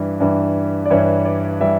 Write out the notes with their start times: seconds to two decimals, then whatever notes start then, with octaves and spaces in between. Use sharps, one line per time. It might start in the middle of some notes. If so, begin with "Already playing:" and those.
Already playing: G2 E3 G3
0.20 G2 E3 G3
0.85 D5
0.90 G2 E3 G3 C#5
1.26 D5
1.60 E3 G3 E5